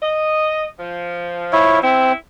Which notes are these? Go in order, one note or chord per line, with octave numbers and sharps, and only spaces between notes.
D#5
F3
E4 C#5 E5
C4 E4